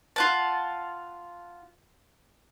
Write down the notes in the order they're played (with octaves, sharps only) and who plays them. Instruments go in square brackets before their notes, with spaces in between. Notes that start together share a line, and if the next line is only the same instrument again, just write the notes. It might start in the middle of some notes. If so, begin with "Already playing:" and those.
[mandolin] F4 F#5 A5